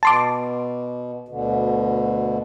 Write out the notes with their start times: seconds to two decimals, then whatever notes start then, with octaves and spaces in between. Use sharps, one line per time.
0.03 B2 A5 C6 D6
1.28 D2 B2 D3